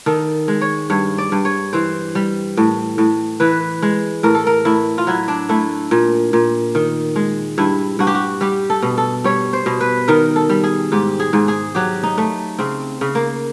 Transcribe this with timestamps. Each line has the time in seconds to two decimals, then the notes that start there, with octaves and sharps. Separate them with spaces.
0.06 D#3 A4
0.48 G#3
0.61 C#5
0.90 G2 C#5
1.18 D5
1.32 G2
1.45 C#5
1.73 E3 C5
2.15 G3
2.57 A2
2.98 A2
3.40 E3 B4
3.82 G#3
4.23 A2 A#4
4.34 A4
4.47 A#4
4.65 A2 E4
4.98 F4
5.07 F#3 E4
5.28 D4
5.49 A3 E4
5.91 A#2
6.33 A#2
6.75 D#3
7.16 G#3
7.58 G2 E4
7.99 G2 F#4
8.07 G4
8.15 F#4
8.41 G3 G4
8.70 A4
8.82 B2
8.98 A4
9.24 G3 C#5
9.53 C5
9.66 B2
9.80 B4
10.08 D#3 A#4
10.36 A4
10.49 G3
10.63 G#4
10.92 G#2 G4
11.20 G#4
11.33 G#2
11.48 G#4
11.75 F#3 G4
12.03 D#4
12.18 A3
12.58 C#3 C4
13.01 C#3
13.15 A#3